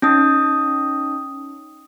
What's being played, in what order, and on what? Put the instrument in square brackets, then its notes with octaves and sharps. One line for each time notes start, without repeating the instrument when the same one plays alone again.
[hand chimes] C#4 D#4 D#6